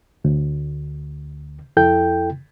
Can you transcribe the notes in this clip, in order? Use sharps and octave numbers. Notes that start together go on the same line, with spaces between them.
D2
F2 E4 A4 G5 G6